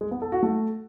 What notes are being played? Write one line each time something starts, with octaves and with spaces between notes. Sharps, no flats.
G#3
B3
A4
F#4
A3